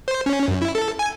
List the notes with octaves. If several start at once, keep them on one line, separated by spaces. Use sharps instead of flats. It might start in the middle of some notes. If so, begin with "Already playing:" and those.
C5
C#4
F#2
E4
A4
G#5